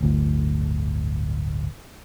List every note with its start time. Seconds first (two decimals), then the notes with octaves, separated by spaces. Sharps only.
0.01 D1 G1 D2 A2